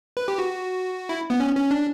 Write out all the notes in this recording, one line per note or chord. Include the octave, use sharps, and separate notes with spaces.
B4
G4
F#4
E4
B3
C#4
C#4
D4